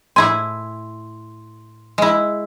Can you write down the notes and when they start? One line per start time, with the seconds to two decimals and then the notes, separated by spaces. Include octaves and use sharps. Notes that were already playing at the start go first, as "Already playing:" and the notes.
0.16 A2 E4 G#5 C6
1.98 G#3 E4